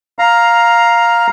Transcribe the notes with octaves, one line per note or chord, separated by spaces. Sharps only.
F5 A#5